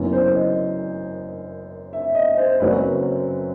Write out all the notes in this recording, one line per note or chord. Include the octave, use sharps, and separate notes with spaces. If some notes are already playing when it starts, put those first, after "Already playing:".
Already playing: F#1 F#2 E3 B3 D#4
C5
D#5
E5
D#5
C5
F#1 F#2 F#3 C4 B4